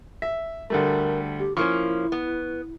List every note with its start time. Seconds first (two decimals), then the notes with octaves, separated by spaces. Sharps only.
0.22 E5
0.70 D2 G3 A3 A#4
1.39 G4
1.57 F3 A#3 C#4 E4 C#6
2.12 B3